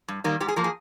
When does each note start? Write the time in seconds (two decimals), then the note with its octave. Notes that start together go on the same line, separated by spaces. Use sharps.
0.08 G2
0.24 D#3 G3 A#3
0.40 G#2 G4
0.48 G#4
0.56 F3 A#3 A#4
0.64 G#4